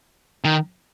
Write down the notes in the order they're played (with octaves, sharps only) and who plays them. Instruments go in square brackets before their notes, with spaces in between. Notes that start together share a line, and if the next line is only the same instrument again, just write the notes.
[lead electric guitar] D#3